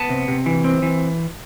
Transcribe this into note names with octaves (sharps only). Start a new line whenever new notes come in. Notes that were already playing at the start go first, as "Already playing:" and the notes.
Already playing: B3 A5
C3
C3
E3
C4
E3